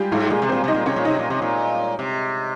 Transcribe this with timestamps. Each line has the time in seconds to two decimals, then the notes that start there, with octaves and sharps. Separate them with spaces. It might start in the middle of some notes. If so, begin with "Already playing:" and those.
Already playing: G3 G#3 F4 G4 G#4
0.12 G#2 F4
0.30 A#2 G#3 G#4
0.42 C3
0.49 A#2 C4 C5
0.64 C3 D#4 D#5
0.75 A#2
0.86 C3 C#4 C#5
0.96 A#2
1.05 C3 D#4 D#5
1.19 A#2
1.30 C3
1.42 A#2
1.99 C3